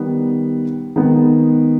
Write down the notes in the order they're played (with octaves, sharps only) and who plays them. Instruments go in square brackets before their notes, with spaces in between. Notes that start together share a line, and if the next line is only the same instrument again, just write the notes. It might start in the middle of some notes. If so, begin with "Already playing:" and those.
Already playing: [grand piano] D#3 G3 B3
D#3 G#3 B3